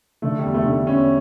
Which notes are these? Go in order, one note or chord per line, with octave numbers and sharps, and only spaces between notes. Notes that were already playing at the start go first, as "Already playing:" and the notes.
D3 A3
E2 G3
A3
D3
A3
E2 C#4